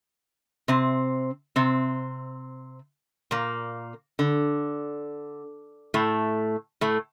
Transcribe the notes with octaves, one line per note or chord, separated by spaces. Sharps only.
C3 C4
C3 C4
A#2 A#3
D3
A2 A3
A2 A3